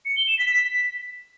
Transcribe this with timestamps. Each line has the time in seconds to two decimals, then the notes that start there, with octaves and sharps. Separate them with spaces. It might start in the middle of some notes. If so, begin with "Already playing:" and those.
0.05 C#7
0.16 G7
0.28 E7
0.39 B6
0.50 B6